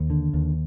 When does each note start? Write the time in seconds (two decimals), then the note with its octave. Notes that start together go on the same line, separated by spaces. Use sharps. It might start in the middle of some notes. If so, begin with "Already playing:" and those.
Already playing: D#2
0.10 D3
0.34 D#2